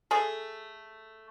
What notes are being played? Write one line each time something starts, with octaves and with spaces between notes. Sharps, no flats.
A3 G#4 A4